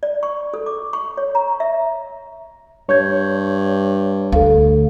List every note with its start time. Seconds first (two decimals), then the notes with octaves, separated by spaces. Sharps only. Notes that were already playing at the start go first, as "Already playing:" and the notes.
0.03 D5
0.23 C#6
0.54 A4
0.66 D6
0.93 C#6
1.17 C#5
1.35 A#5
1.60 E5
2.89 G2 C#5 C#6 G6 G#6
4.32 D2 A4 F5